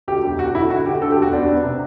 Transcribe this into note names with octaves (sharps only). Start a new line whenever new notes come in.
D2 G4
E1
E1 F#4
D3 E4
D3 F#4
D3 G4
D2 A4
G4
E1 F#4
B3 D4
B3
C3